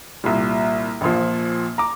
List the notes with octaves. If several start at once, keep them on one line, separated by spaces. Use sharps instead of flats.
C2 A#2 G3
A#1 A#2 F3
A#5 D6